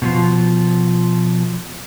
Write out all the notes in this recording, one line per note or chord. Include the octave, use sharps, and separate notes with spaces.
B2 D#3 F3